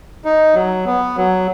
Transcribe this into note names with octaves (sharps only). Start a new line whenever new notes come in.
D#4
F#3
B3
F#3